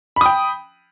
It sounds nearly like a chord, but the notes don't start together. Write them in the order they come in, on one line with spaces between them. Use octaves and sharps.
B5 D#6 G5